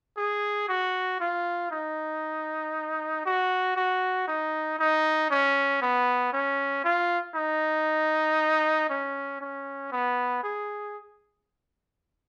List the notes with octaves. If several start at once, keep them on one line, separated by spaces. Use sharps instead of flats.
G#4
F#4
F4
D#4
F#4
F#4
D#4
D#4
C#4
B3
C#4
F4
D#4
C#4
C#4
B3
G#4